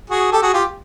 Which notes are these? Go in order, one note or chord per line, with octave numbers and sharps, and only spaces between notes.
F#4 G#4
G4 A4
F#4 G#4
F4 G4